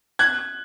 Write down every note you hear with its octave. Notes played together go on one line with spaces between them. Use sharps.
F#6 G#6